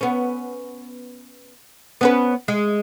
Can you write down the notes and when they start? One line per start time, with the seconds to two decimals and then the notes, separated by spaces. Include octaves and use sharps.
0.01 B3 C#4
2.01 B3 C#4 B4
2.48 G#3